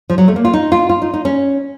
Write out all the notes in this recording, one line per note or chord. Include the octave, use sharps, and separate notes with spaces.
F3
F#3
A3
A#3
F4
D#4
F4
F4
D#4
D#4
C#4